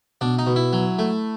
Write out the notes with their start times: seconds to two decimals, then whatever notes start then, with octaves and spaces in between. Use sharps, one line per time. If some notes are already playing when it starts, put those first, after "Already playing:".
0.21 B2 D4
0.39 D#4
0.47 B2
0.56 E4
0.73 F#3
0.99 A3